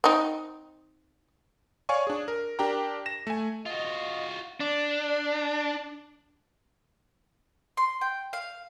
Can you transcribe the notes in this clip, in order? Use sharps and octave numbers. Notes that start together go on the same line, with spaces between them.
C4 D#4
C#5 D5 F5 G#5 C#6
D4 G#4
A#4
D4 G4 A#4 G5 A#5
A#6 E7
A3 G#5
F4 F#4 D#5
D4
C6
G5
F5